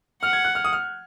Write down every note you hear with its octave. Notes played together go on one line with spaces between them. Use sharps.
F#5 F6
G#6
F#6
F6
D#6
F6